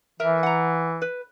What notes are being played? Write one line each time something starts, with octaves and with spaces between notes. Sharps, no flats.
E3 A#4 E5
F#5 A#5
B4